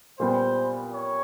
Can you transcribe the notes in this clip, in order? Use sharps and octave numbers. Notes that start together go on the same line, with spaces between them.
A#2 G3 B3 C5
C#5